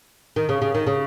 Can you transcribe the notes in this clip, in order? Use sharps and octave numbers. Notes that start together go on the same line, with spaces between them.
D#3
C#3
C#3
D#3
C#3